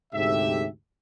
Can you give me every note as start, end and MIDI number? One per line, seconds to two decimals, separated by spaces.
0.13 0.66 38
0.13 0.66 44
0.13 0.66 48
0.13 0.66 67
0.13 0.66 69
0.13 0.66 76